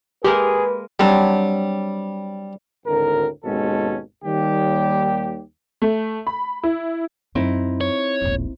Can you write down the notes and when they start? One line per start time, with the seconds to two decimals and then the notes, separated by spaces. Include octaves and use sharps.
0.24 G#3 A#3 G4 G#4 A#4 B4
1.00 F#3 G3 C4 D4
2.86 G#1 D2 A2 A#4
3.44 G#1 D#2 B2 G#3 C#4 A4
4.24 D#2 G3 G4
5.82 A3
6.27 B5
6.64 E4
7.35 F#2 F#3 C4 D#4 E4
7.81 C#5
8.21 E1 A#1